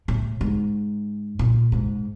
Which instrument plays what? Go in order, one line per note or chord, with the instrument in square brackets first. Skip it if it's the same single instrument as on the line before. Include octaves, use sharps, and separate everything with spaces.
[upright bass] A2
G#2
A#2
G#2